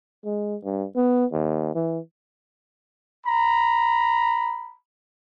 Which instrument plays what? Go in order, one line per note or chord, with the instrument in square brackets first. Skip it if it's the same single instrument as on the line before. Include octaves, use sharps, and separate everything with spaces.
[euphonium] G#3
G2
B3
D#2
E3
[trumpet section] A#5 B5